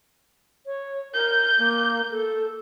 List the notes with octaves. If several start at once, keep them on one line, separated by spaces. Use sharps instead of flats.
C#5
A#4 G6
A#3
A4